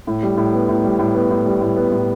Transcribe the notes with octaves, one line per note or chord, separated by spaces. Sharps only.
A2
G3
A2
B3
A2
G3
A2
B3
A2
G3
A2
B3
A2